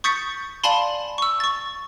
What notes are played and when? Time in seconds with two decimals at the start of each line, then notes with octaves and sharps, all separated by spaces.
0.04 C#6 D#6 G6 A6 B6 C#7
0.64 D5 F5 G#5 A5 B5 C6
1.18 C#6 E6
1.40 C#6 A6